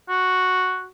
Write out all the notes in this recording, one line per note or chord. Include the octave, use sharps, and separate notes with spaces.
F#4